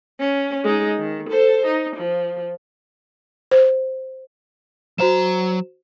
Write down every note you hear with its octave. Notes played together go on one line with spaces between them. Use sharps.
C#4
G#3 D#4
D#3
A4 C5
D#4
F3
C5
F#3 F#4 C5 A#5 E7